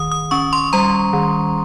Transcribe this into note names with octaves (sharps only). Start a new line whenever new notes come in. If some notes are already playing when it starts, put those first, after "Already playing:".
Already playing: D#3 D#6
D#6
C#4 C#6
C6
G3 A#5
D#3